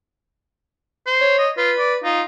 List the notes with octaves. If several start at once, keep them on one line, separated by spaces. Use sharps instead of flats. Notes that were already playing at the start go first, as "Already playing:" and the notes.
C5
C#5
D#5
F4 B4
D5
D#4 F4